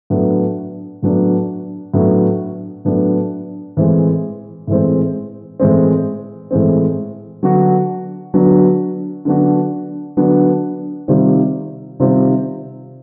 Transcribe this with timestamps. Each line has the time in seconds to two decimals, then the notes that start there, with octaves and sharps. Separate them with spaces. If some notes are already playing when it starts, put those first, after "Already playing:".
0.10 A2 F#3 B3 D4
1.02 A2 F#3 B3 D4
1.94 A2 F#3 B3 D4
2.85 A2 F#3 B3 D4
3.77 A2 E3 G#3 C4
4.67 A2 E3 G#3 C4
5.60 A2 E3 G#3 C4
6.51 A2 E3 G#3 C4
7.43 D3 F#3 B3 D4 F#4
8.34 D3 F#3 B3 D4 F#4
9.25 D3 F#3 B3 D4 F#4
10.17 D3 F#3 B3 D4 F#4
11.08 C3 D#3 G3 C4 F4
12.00 C3 D#3 G3 C4 F4